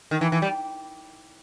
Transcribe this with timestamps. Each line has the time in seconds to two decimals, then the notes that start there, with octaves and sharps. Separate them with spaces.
0.11 D#3
0.21 E3
0.32 E3
0.42 G3